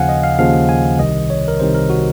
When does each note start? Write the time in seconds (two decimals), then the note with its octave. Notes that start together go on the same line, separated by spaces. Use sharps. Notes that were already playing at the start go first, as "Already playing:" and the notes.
Already playing: D#2 C#3 F3 F5 F#5 G#5
0.09 D#5
0.24 F5
0.39 D#2 C#3 F3 F5
0.69 G#5
0.99 C2 C3 D#3 D#5
1.30 C#5
1.48 A#4
1.60 C2 C3 D#3 C5
1.75 A#4
1.90 F#4